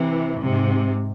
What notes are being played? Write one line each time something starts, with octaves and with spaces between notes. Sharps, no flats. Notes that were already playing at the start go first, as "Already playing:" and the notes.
Already playing: C3 E3
G#2 C3